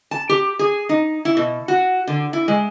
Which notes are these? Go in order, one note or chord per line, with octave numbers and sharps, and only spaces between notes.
A5
G4
G#4
D#4
E4
B2
F#4
D3
E4
G#3